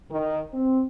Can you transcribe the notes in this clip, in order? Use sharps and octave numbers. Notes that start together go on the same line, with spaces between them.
D#3
C4